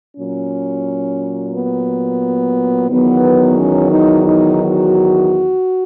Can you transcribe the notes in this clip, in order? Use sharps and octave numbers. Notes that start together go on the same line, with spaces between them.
A#2 F#3 C#4
B3
E2 D#3 F#3 B3
C#4
D#4
D#4
F#4